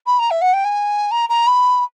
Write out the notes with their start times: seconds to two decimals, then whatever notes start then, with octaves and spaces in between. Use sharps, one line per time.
0.06 B5
0.19 A#5
0.31 E5
0.41 F#5
0.53 G5
0.64 G#5
1.11 A#5
1.29 A#5
1.47 B5